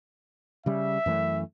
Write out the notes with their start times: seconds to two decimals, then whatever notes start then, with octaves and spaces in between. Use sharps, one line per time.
0.66 C#3 G3 E5
1.06 F#2 E3 A3